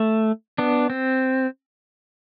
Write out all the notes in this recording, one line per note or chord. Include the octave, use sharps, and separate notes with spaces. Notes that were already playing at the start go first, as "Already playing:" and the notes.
Already playing: A3
B3 D4
C4